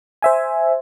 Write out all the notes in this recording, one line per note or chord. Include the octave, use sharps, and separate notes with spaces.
C5 E5 G#5